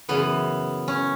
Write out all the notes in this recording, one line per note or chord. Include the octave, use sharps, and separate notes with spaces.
F#2 C#3 E3 B3
C#4